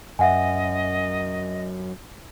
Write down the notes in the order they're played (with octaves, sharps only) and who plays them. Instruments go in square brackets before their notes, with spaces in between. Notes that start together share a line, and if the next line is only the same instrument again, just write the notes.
[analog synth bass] F#2 [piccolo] D#5 [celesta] E5 F#5 G#5